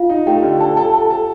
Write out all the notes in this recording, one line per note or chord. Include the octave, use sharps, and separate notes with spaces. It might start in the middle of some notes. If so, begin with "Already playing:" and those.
Already playing: F4 F5
D#4
A3 G4 G5
D3
A4
A4
A4
A4